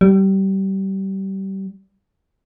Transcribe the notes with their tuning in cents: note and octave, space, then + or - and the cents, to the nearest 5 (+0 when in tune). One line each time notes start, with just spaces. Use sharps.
G3 -25